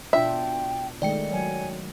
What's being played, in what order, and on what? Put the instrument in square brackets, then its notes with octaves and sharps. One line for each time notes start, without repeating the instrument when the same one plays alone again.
[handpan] B2 D4 F4 [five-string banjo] E5 [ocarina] G5
[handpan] D#3 G#3 A3 [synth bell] D5 G5 C#7
[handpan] F#3 [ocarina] G#5